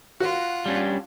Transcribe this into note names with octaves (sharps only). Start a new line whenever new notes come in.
F4 F#4 F#5
G3 C#4 D4